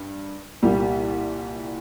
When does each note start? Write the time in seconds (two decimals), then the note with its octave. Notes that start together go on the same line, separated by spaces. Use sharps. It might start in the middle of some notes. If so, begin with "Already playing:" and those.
Already playing: G2
0.62 C2 A#2 G3